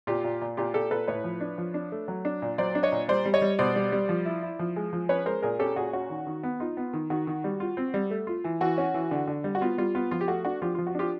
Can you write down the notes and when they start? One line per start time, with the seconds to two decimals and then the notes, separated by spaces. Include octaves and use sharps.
0.07 A#2 F4 G4
0.24 A#2
0.41 A#2
0.57 A#2 F4 G4
0.74 A#2 G4 A4
0.91 A#2 A4 B4
1.07 A2 B4 C#5
1.24 F3
1.41 D4
1.58 F3
1.74 D4
1.92 A3
2.08 F#3
2.25 D4
2.42 A#2
2.58 F#3 C5 D5
2.75 D4
2.83 C#5 D#5
2.92 A#2
3.08 G3 C5 D5
3.25 G3
3.34 C#5 D#5
3.42 G3
3.59 B2 C5 D5
3.76 G3
3.92 G3
4.09 F3
4.25 E4
4.43 E4
4.59 F3
4.76 G#3
4.93 F3
5.09 C#4 B4 C#5
5.26 G#3 A#4 C5
5.43 A#2 G#4 A#4
5.59 C#4 G4 A4
5.76 A#2 F#4 G#4
5.93 C#4 F#4
6.10 D#3
6.27 D#3
6.43 B3
6.60 D#4 F4
6.77 B3
6.93 D#3
7.10 D#3 F#4
7.27 D#3
7.44 G3
7.60 F4
7.77 C4
7.94 G3
8.11 A3
8.27 F4
8.44 E3
8.61 E3 F#4
8.78 C#4
8.94 E3
9.11 D3
9.27 D3
9.44 G3
9.55 F#4
9.61 B3 F4
9.78 G3 F4
9.95 B3 F4
10.11 F3 F4
10.21 G4
10.28 A3 F#4
10.45 D4 F#4
10.62 F3 F4 G4
10.75 F4
10.78 F3
10.87 F#4
10.95 D4 F4 G4